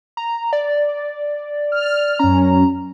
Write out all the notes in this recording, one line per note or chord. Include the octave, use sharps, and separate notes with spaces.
A#5
D5
F6
F#2 C#4 A#5